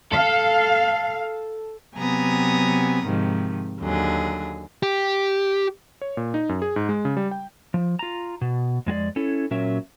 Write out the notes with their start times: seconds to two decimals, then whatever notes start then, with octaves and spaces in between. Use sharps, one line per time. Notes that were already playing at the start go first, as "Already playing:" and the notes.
0.12 A4 F5
1.96 C3 F#3 B3 G#5 A#5 D#6
3.06 G#2 C3 D#3 F3
3.81 D#2 D3 F#3 G#4
4.83 G4
6.01 C#5
6.17 A#2
6.34 D#4
6.49 F#2
6.62 G#4
6.76 G#2
6.89 G#3
7.05 C#3
7.17 G3
7.31 G5
7.74 F3
7.99 F4 A#5
8.41 B2
8.86 F2 G#3 F#4 D5
9.16 C#4 E4 A4
9.51 A#2 F#3 C#4 A#4 E5